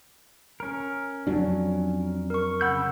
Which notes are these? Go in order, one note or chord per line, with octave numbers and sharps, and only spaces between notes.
C#4 A#4
F2 F#3 D4
A#4 C#6
C#3 F#5 B5 E6 G6